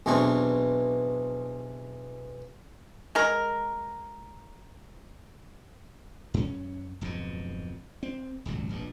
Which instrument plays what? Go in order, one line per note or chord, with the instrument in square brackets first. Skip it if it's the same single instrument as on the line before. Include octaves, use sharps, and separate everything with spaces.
[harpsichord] B1 E2 E3 C4 D4 C#6
[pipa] G#3 A#4
[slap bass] F#2 C#4
D1 F2 G#2 B2
C4
D#1 G#1 C#2 F#3
F1 A#1 G2